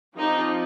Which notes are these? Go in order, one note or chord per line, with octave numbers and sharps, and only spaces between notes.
F3 C4 D#4 G4